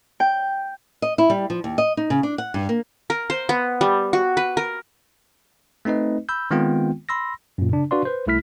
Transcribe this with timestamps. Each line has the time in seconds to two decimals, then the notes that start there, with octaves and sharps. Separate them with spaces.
0.20 G5
1.02 D#5
1.18 E4
1.30 G3
1.50 F3
1.64 D#2
1.78 D#5
1.97 D#4
2.10 C#3
2.23 D4
2.38 F#5
2.54 G2
2.69 A#3
3.10 A#4
3.30 C5
3.49 B3
3.81 G3
4.13 F#4
4.37 B4
4.57 A#4
5.85 A3 C4 D#4 B4 D#5
6.29 B5 E6 G6
6.51 D#3 G#3 B3 C4 F4 G5
7.09 B5 C6 E6 A#6
7.58 F#2 A#2
7.71 C#3 D4
7.91 D4 F#4 B4 D5 F5 C6
8.05 B4 C5
8.27 C2 A3 E4 F6 B6